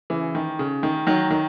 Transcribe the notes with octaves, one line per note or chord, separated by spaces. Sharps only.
C#3 E3
D#3
C#3
D#3
D#3 F#3
D#3